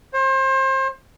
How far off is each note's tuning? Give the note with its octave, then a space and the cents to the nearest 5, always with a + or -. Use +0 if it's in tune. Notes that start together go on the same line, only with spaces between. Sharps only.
C5 +30